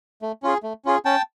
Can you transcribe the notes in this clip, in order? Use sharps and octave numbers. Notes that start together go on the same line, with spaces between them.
A3
C#4 F4 G#4
A3
C#4 F4 G#4
C#4 G5 A5